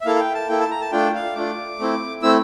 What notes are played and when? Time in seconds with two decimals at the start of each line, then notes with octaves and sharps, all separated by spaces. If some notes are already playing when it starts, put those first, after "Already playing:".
0.01 E5
0.05 A#3 E4 A4 F5
0.16 F5
0.20 G5
0.35 A5
0.49 A#3 E4 A4 G5
0.60 A5
0.71 A#5
0.81 A5
0.92 A3 D4 F4 G5
1.15 F5
1.35 A3 D4 F4 D6
1.79 A3 C4 E4
2.22 A3 C4 E4 E6